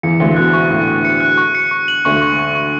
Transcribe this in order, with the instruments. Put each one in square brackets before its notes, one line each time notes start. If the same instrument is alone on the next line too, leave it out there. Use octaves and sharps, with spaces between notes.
[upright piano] E2 E3 [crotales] C#7
[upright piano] D2 D3 [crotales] C#7
[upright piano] B2 [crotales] F#6
[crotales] C#6
[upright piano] A2 [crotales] C#6
[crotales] C#6
C#7
F#6
C#6
C#7
C#6
F#7
[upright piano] D2 D3 [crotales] C#6
[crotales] C#6
C#6
C#6